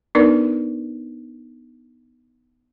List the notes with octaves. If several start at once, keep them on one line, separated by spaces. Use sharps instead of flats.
B3 D4 D#4 A#4 B4 D5